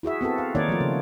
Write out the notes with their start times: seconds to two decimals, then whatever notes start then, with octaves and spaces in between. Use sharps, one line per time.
0.03 E4 F#4 G#4 E5
0.21 B3 C4 F#4 A4
0.38 F5
0.55 D#3 A#3 D#4 C#5 D5
0.68 F3 A3 F4
0.80 C#3